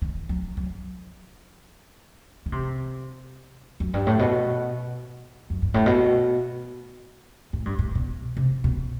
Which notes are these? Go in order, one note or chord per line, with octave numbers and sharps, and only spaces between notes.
D#3
F#3
F#3
D#3
C3
F#2
G2
A2
B2
F#2
G2
A2
B2
A2
G2
A2
B2
C3
B2